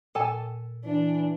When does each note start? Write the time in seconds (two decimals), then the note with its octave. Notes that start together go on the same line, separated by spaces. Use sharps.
0.15 A#2 A4 G#5 A5
0.85 E3 D4